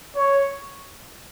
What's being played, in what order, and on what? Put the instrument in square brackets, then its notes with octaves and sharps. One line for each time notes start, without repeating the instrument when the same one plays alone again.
[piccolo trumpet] C#5